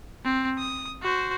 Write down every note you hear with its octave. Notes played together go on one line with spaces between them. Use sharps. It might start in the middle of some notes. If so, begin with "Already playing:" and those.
C4
D#6
F#4 C5